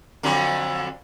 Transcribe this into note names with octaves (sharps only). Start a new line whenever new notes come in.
F2 D3 F#3